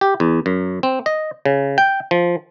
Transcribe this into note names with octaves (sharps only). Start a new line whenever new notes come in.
G4
E2
F#2
C4
D#5
C#3
G5
F3